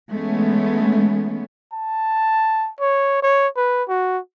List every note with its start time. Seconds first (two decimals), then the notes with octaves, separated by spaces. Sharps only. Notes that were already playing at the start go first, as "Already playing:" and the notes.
0.12 E3 G#3 A3 B3 C#4
1.73 A5
2.80 C#5
3.22 C#5
3.56 B4
3.88 F#4